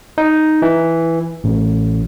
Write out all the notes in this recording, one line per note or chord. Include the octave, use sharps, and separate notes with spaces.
D#4
E3
A1